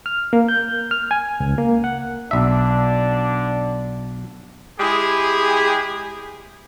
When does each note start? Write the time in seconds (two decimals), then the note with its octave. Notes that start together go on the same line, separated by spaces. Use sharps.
0.06 F6
0.33 A#3
0.49 G6
0.91 F6
1.11 G#5
1.40 C#2
1.58 A#3
1.84 F#5
2.31 B1 D3 D4 E5
4.79 G#3 E4 G4 G#4